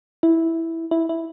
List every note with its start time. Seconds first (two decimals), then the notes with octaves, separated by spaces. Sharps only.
0.23 E4
0.91 E4
1.09 E4